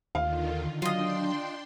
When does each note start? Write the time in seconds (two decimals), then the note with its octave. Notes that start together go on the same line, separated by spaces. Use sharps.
0.15 D#2 D3 D#3 F4 F5
0.82 F#3 D4 F4 D#5 G5 C6